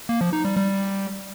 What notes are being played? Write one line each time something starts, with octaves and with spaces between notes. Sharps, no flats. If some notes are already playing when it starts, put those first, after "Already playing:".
A#3
F3
D#4
G3
G3